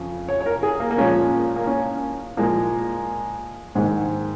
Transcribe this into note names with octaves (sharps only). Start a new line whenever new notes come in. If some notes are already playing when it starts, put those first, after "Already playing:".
Already playing: F2 C#3
C#5
C#5
A#4
G#4
A#3
A#3
A#2 F3 G#3 C#4
A#3
C#4
A#2 F3 G#3 A#3
G#2 D#3 G#3